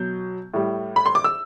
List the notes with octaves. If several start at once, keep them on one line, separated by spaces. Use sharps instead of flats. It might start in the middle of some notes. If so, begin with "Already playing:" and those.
Already playing: B2 F#3 G6
A2 G3
B5
C6
D6
E6